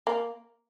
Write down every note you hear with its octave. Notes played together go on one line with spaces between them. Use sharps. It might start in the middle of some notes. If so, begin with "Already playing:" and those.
A#3